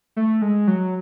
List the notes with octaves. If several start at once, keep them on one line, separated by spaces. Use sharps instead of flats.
A3
G#3
F#3